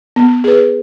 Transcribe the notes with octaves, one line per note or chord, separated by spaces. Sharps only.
B3
G#4 B4